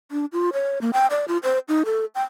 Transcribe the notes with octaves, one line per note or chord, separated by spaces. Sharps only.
D4
F4
C#5
A#3
G5
D5
F4
C5
D#4
A4
G5